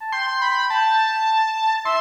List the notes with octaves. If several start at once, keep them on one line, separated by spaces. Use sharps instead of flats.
A5
G5 C6
B5
A5
E5 C6